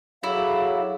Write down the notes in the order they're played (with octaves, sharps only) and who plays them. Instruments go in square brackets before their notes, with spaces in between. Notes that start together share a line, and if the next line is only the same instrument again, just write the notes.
[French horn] F#3 [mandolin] E4 [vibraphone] G#4 A4 D6 [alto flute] F5